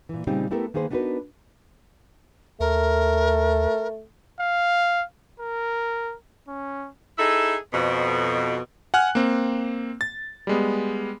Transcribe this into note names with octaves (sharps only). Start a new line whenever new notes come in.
A#2 E3
A#2 C#3 G3 C4 D#4 G4
A3 B3 E4 G4 A4 A#4
D#3 A#3 G#4 B4 C5
B3 D4 D#4 F#4 A#4 B4
D#2 A3 A#4
F5
A#4
C#4
D#4 E4 G#4 A4 E5
F2 B2
F#5 G#5 F6 F#6
A#3 C4
A6
G3 G#3 B3